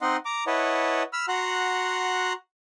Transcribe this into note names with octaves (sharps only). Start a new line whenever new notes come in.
C4 D#4 D#5 F#5 C6
A#5 D6
E4 B4 C#5 D#5 F#5 A5
B5 E6 F6
F#4 F#5 A#5 C6 F#6